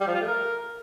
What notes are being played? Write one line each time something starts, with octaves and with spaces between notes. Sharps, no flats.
G3
F3
F4
A3
A#4